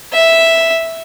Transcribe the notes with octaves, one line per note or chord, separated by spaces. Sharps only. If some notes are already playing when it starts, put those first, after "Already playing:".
E5